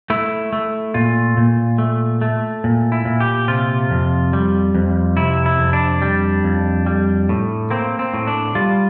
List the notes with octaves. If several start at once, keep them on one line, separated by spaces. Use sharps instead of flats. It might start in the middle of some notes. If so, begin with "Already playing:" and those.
A3 E4
A3
A#2 F4
A#2
A3
A3
A#2
E4
A#2
G4
C3 F4
F2
G3
F2
C3 E4
E4
F2
D4
G3
F2
G3
A2
A#3 C4
C4
A2
D4
G3 F4